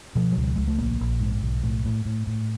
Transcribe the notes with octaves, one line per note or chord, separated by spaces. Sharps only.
B2 F3
F#3
C#2
G3
C#2 G#3
A3
A#1 A#3
A#1
G#2
B1
A2
A2
A2
A2